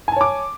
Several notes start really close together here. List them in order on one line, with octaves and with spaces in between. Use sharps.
G#5 A5 C#5 D6